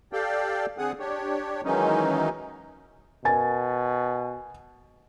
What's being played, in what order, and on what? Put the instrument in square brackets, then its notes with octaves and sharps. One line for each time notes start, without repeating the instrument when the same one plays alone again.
[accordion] G4 A4 D5 F5 G5
D3 C4 G#4 F#5 D#6
D4 G4 C#5
D#3 E3 F#3 G#3 C#4 D#4
[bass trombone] B2 [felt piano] A#4 G#5 A6